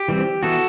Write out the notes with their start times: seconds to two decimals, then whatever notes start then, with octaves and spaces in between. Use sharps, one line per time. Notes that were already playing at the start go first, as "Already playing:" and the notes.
Already playing: G4
0.08 E3 G3 C4
0.43 E3 B3 F#4 A4